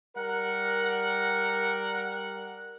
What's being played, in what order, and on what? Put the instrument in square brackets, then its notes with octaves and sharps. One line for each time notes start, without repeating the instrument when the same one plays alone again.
[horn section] G3 A#4 F#5